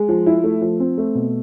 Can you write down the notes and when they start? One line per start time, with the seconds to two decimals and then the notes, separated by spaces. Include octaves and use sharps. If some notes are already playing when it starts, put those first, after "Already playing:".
Already playing: G#3
0.09 F3
0.26 E4
0.44 A3
0.61 F3
0.80 C4
0.98 A3
1.15 B2